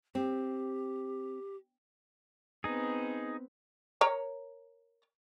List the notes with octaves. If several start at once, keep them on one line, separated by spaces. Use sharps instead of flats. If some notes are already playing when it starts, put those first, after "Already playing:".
C4 G4
B3 C4 D#4 G#4
A#4 C#5 A#5